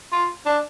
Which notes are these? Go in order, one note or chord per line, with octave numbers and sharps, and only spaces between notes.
F4
D4